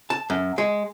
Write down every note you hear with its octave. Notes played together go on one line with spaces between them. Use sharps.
A5
F#2
G#3